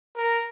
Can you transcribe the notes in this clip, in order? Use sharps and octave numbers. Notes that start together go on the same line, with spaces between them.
A#4